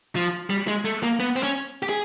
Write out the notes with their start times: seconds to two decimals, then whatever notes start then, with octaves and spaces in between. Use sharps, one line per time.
0.16 F3
0.50 G3
0.68 G#3
0.85 A3
1.03 A#3
1.20 B3
1.36 C4
1.43 C#4
1.83 G4
1.89 G#4